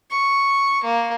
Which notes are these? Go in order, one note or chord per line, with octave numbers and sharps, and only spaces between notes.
C#6
A#3